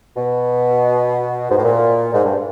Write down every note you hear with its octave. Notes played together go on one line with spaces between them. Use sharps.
B2
G#2
A2
A#2
G#2
G2